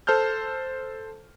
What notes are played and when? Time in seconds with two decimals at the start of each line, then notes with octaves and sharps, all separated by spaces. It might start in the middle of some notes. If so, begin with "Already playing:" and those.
0.07 A4 C5 A5 F6 G6